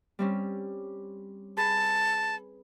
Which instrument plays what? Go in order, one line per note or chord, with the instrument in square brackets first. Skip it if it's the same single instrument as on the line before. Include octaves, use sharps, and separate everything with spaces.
[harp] G3 C4 C#4
[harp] G#4 B4 [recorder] A5